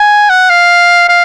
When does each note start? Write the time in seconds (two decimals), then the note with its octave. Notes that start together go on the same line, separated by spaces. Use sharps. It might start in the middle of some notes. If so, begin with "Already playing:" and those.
Already playing: G#5
0.30 F#5
0.50 F5
1.09 F5